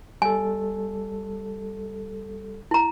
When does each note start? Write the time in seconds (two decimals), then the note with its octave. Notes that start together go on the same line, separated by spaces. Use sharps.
0.22 G3 A4 G#5
2.71 E4 A#5